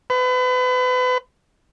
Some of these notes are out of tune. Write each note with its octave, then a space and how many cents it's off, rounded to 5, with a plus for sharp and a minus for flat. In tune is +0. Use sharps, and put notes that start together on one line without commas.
B4 +35